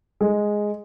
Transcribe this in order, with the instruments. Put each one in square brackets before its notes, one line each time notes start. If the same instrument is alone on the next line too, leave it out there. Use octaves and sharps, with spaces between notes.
[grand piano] G#3